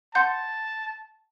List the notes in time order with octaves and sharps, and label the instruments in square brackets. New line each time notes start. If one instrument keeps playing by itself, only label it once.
[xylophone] F#5 C6 G6 [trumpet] A5